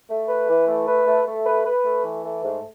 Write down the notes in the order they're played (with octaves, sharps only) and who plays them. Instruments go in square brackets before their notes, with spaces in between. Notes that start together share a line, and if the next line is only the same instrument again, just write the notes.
[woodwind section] A3
B4
E3
A3
B4
A3
A3
B4
B4
A3
E3
A3
G#2